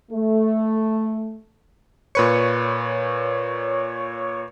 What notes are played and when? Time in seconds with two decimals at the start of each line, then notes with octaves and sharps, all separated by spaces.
0.11 A3
2.15 A#2 B4 C#5 C#7